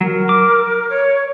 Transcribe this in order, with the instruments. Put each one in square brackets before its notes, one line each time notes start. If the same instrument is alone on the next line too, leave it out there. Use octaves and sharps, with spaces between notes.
[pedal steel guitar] F#3 [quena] A#4
[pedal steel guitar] D6
[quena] C#5